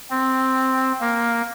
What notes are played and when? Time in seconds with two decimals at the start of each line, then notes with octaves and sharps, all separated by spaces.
0.11 C4
1.01 A#3